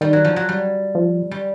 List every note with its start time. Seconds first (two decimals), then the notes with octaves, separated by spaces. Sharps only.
0.01 D#3 G3
0.13 F#3
0.25 F3
0.36 F#3
0.49 G3
0.95 F3
1.31 G3